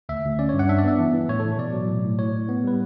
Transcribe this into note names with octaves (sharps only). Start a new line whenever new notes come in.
D2 E5
D2
C#4 D5
G2 C#5
F#5
D4 E5
D5
B3 E5
E3
E3
A2 C#5
E3 A4
B2 D5
F#3
A2
A2
A2 C#5
A2
B3
G3 B4